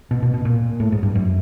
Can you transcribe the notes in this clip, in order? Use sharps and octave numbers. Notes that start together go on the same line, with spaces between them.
B2
B2
B2
A#2
A2
G#2
G2
F#2